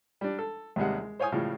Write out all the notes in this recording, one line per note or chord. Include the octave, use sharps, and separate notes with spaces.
G3 D4
A4
D#2 C3 G3 G#3 F#5
G#3
C5 C#5 F5 G#5 D#6
A2 C#3 F3 G3